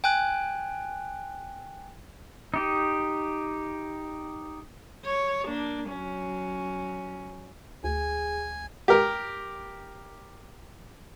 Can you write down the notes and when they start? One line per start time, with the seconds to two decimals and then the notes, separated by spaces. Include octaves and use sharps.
0.04 G5 G#5 F#6
2.54 D#4 G4
5.05 C#5
5.47 A#3 D4
5.88 F#3 C#4
7.84 D2 G#4 G#5
8.88 G4 A#4